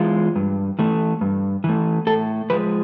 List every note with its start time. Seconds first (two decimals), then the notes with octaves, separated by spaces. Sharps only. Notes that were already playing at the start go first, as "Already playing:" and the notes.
Already playing: E3 G#3 F4
0.36 G2
0.79 E3 A3
1.21 G2
1.64 E3 A3
2.07 A2 A4
2.50 F3 G#3 B4